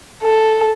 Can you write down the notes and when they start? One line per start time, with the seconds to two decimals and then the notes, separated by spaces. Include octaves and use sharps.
0.23 A4